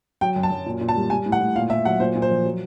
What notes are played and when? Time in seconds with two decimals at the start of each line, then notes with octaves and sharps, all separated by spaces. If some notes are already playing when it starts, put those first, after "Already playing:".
0.21 F#3 G5
0.36 F#2
0.43 A5
0.50 F#2
0.66 A#2
0.81 A#2
0.89 A5
0.96 G3
1.10 G3 G#5
1.26 A2
1.32 F#5
1.41 A2
1.56 A#2 F5
1.70 A#2 E5
1.85 F#3 F#5
2.00 A#2 C5
2.15 A#2
2.22 C5
2.30 F3
2.45 F#3